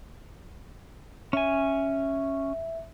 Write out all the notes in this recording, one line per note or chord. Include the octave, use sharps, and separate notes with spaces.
C#4 E5 G#5